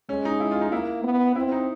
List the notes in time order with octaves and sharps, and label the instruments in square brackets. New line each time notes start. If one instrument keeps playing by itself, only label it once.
[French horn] G#3 [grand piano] C#4
[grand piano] D#4
E4
F4
D#4
[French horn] A#3 [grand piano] E4
[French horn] B3
[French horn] C4 [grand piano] E4
[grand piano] D#4